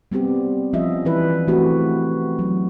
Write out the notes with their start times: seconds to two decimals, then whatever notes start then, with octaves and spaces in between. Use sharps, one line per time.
0.12 G3 B3 C4 G4
0.73 F3 G3 C#4 F4 D#5 E5
1.05 E3 E4 B4
1.47 E3 A3 C4 F#4 G4
2.39 F#3